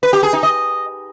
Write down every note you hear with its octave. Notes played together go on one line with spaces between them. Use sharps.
B4
G4
G#4
D#4
D#5